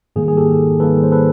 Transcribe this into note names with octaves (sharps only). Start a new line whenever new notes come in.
G#2 D#3 G3 A#3 G#4
G#4
G4 A4
G#2 D#3 G3 A#3 A4 B4
C5
A4 B4